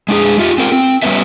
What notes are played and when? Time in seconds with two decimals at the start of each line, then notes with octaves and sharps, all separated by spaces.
0.09 G#3 D4 G#4
0.39 F4 G4 E5
0.58 C4 A#4
0.72 C4
1.03 G3 B3 C#4 B4 E5